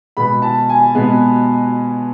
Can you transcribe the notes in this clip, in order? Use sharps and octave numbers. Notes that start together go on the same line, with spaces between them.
B2 G#3 B3 B5
A5
G#5
B2 G#3 B3 B4